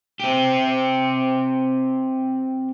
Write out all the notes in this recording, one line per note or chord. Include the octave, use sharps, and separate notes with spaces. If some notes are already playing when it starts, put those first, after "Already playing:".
C4 G4